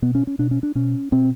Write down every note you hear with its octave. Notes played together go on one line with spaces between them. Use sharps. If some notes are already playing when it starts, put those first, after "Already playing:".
B2 B3
C#4
C#4
B2 D4
C#4
D4
B2 C#4
B2 C4